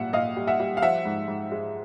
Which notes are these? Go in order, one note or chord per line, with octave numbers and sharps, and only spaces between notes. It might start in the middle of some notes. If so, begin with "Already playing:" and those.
Already playing: A#2 G3 E5 F#5
A#2 D#5 F5
G3
E5 F#5
G3
F5
F3 E5 F#5
G#2
G#2
G#3